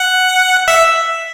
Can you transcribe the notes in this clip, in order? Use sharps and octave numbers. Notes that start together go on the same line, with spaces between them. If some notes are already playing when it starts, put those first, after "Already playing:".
Already playing: F#5
E5